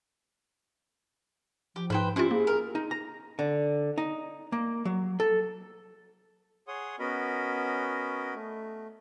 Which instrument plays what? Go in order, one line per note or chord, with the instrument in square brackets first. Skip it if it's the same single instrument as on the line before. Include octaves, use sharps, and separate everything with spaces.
[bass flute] F3 [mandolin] G4
[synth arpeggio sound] G#2 D#4 [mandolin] B4 C5 G5
[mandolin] C4 E4 [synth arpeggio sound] C#4 F4 [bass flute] G4
[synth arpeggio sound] A#3 [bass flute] G#4
[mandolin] A#4
[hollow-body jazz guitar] D#4
A#5
D3
D#4
A#3
F#3
A4
[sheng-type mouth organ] G#4 C#5 F#5 C6 D#6
B3 C#4 F#4 A#4 D#5 B5
A3